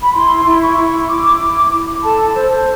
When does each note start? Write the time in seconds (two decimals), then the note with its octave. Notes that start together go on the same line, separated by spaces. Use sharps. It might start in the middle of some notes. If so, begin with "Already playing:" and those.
0.03 B5
0.14 E4 C6
0.45 E4
0.50 C6
0.62 C#6
0.77 E4
1.08 E4 D6
1.40 E4
1.71 E4
2.03 A4 A5
2.35 C5